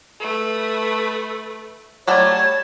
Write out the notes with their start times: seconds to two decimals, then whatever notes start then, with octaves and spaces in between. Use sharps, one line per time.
0.20 A3 B4
2.07 F#3 G3 A3 C#5 A5